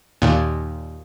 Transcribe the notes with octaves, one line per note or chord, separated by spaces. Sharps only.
D#2 A#2